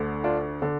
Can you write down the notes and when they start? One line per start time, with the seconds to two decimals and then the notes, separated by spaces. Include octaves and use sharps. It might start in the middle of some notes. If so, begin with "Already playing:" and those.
Already playing: D2 D3
0.24 D4 F4
0.62 D3